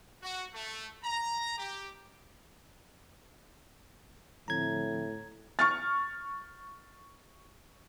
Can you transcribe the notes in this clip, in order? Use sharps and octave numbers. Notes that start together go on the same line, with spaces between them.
F#4
A3
A#5
G4
A2 D3 F3 A3 C4 A#5 G#6
C#6 F6 A6